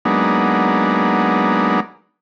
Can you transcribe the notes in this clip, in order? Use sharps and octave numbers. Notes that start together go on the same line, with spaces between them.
F#3 G#3 A#3 B3 D4 D#4